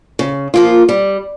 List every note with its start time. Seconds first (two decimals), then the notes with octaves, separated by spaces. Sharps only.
0.19 C#3
0.54 F3 A#3 F4
0.89 G3